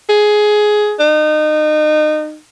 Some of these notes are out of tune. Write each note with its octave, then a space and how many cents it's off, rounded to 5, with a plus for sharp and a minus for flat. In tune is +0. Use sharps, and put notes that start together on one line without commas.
G#4 +15
D#4 -30